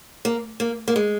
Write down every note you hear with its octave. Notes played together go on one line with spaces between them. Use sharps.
A#3
A#3
A#3
G#3